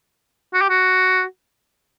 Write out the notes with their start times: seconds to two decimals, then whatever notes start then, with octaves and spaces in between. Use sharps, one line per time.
0.54 F#4
0.61 G4
0.69 F#4